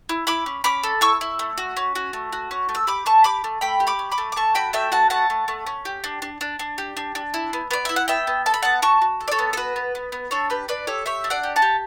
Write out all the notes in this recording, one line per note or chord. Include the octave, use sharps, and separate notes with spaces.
E4
E4 B5 D6
C#4
C#4 B5 D6
A4
E4 C#6 E6
E4
A3
F#4
C#4
F#4
A3
F#4
C#4
A3
E6
G4 B5 D6
A3 A5 C#6
G4 B5 D6
A3
A3 G5 B5
G4
B5 D6
C#4
B5 D6
A3
D6
A3 A5 C#6
F#4 G5 B5
A3 E5 G5
F#4 F#5 A5
A3 F#5 A5
A3
A3
C#4
G4
D4
D4
D4
D4
G4
D4
D4
E4
B3
B3 D5
E4 E5
F#5
B3 E5 G5
B3
A4 A5
B5
B3 F#5 A5
F#4 A5 C#6
F#4
A4
D5
A4 C#5
B3
A4
F#4 B4
B3
B3
B3
D4 A4 C#5
G4 B4
D4 B4 D5
G4 A4 C#5
G4 C#5 E5
D4
D5 F#5
G4
F#5 A5
G4